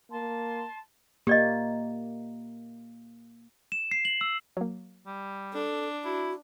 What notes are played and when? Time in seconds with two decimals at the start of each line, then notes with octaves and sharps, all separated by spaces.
0.11 A#3 A5 C6
1.27 A#3 G4 D5 D#5
3.72 E7
3.91 C7
4.05 F#7
4.21 E6
4.57 F#3 A#3
5.07 G3
5.54 D4 A4
6.05 E4 F#4